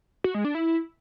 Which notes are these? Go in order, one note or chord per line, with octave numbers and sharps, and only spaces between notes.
F#4
G#3
D4
E4